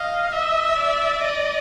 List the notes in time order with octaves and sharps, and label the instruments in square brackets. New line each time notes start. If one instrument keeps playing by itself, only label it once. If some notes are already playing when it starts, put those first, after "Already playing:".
Already playing: [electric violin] D#5 [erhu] F5
[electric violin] D#5 [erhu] E5
[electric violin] D5
[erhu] D#5